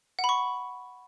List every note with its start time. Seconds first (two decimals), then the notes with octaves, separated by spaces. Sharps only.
0.19 F#5
0.24 B5
0.29 C#6